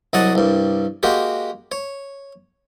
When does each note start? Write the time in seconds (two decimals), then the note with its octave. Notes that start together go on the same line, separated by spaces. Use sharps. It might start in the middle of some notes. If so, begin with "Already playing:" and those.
0.13 C2 F#3 D#5 F#5 G#5 A5
0.35 C2 G2
1.03 G#3 A#3 F#4 G4
1.72 C#5